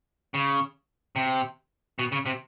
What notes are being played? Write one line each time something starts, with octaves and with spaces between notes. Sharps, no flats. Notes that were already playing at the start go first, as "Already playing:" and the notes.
C#3
C3
B2
C#3
C3